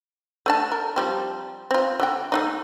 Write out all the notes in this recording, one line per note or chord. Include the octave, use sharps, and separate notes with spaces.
A3 D4 A5
A#4
F3 G3 C4
C4 F4
D3 E4 G5
A3 D4 D#4